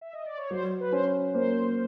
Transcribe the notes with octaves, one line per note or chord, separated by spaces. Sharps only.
E5
D#5
D5
C#5
F#3 C5
B4
C#4 C5
A#3 C5